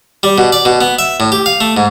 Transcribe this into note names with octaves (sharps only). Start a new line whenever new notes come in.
G3
B2
D5
B2
B3
E5
A2
G4
F5
A3
G#2